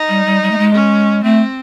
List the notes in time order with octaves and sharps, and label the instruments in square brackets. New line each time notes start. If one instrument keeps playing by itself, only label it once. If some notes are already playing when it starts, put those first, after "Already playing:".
Already playing: [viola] D#4
[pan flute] G3
G3
G3
A3
G#3
[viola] C#4
[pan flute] A3 [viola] C4